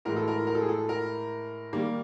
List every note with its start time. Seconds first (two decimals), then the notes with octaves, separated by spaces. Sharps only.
0.05 A2 E3 G#3 A#4
0.16 A4
0.28 A#4
0.47 A#4
0.55 A4
0.62 G#4
0.69 A4
0.89 A#4
1.73 D#3 G3 A#3